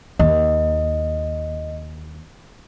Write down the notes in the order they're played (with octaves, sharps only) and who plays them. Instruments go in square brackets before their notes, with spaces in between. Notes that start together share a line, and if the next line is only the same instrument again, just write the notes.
[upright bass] D#2 [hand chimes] D#5